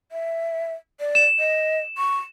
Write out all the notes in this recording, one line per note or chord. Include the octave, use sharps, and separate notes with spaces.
E5
D5
E7
D#5
C#6